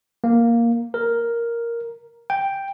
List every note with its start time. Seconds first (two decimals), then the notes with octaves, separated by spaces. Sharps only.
0.24 A#3
0.94 A#4
2.30 G5